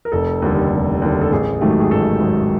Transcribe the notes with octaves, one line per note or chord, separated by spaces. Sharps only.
A#4
F1 A4
D#2 D3 G3
F1
D#2 D3 G3
A4
A1 G#4
G#2 D#3 F#3 A3 G4
G#4
A1 A4
G#2 D#3 F#3 A3